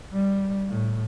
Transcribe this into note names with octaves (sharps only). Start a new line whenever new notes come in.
G3
A2